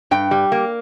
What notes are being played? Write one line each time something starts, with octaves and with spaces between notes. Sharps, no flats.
G2 G5
G3
A#3